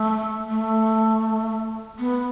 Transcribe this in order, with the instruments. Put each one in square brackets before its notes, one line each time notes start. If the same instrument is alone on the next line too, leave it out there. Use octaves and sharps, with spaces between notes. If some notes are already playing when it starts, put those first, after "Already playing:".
Already playing: [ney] A3
A3
B3